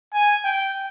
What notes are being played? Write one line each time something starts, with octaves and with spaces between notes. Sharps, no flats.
G#5
G5